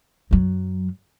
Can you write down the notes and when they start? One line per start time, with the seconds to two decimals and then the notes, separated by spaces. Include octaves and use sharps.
0.31 F#2 F#3